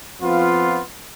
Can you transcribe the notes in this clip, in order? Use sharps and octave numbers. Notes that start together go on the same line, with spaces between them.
F2 F3 B3 F4